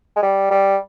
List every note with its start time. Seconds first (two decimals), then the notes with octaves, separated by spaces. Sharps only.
0.16 G#3
0.23 G3
0.51 G3